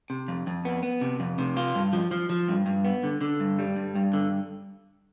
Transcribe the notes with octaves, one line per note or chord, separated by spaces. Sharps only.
C3
F2
F2
B3
B3
C3
F2
C3
F4
G2
F3
F3
F3
G2
G2
B3
D3
D3
G2
G3
G2
G2
D3